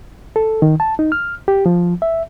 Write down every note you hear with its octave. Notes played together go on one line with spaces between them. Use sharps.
A4
D#3
A5
D#4
F6
G4
F3
E5